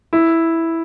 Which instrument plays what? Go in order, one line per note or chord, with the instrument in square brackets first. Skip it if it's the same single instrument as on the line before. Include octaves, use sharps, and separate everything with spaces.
[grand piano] E4